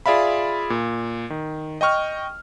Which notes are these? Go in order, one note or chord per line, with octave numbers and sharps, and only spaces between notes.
F4 G#4 D5 E5 F5 B5
A#2
D#3
D#5 G5 C#6 F6